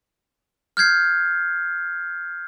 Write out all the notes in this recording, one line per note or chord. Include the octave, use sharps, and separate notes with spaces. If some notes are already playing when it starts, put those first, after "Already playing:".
F6 G6 G#6 C7